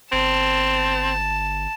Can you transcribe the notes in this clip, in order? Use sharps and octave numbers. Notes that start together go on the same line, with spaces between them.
G1 C4 A5